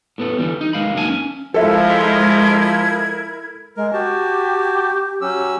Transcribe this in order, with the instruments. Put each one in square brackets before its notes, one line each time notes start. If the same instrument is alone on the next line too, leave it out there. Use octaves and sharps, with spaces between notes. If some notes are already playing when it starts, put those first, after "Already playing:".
[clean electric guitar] A2 B3 A4
D3 E3 G3
D#4
D#3 G#3 F5 B5
F#2 D#3 A#3 C4 G#5 A5
C#4
[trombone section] F3 [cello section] G#3 D#4 [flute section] E4 A#4 G#6 [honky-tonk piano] A4 E5
[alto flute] G#3 [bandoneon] A#4
[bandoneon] F#4 A5 [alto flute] G4
[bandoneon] F#3 C#4 E6